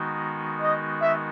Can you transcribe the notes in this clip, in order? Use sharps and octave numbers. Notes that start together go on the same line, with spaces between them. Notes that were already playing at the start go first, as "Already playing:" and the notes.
Already playing: D#3 G#3 B3 D#4 F#4
D#5
E5